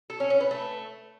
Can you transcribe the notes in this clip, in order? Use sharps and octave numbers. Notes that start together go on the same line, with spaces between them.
A4
C#4
C#4
B3
A3